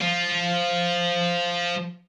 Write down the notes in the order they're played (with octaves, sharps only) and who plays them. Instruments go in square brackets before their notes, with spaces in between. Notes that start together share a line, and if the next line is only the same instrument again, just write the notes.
[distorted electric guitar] F3 F4